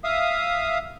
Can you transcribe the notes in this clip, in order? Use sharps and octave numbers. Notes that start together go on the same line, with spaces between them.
E5 F5 D#6